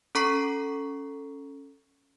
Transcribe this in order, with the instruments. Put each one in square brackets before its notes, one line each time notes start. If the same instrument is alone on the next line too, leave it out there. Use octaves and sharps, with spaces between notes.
[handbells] C#4 A4 A#5 C#6 B6 C7